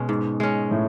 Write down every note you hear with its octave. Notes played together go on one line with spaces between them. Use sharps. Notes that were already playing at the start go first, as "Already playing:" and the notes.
Already playing: B2 G#3 C#4
G#2
G#3 C#4
A2